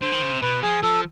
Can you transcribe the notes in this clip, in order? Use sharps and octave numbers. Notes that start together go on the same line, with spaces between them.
D3 C5
D#3
C#3
C3
B2 B4
F3 G#4
F3 A4